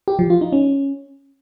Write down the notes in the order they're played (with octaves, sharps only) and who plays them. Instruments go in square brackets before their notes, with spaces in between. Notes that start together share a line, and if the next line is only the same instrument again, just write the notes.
[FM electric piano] G4
F3
F4
D#4
C#4